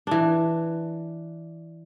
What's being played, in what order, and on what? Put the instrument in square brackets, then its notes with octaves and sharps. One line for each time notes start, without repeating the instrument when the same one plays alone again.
[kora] E3 D4